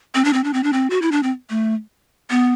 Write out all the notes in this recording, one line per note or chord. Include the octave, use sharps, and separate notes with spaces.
C4
D4
C4
D4
C4
D4
C4
F#4
E4
D4
C4
A3
B3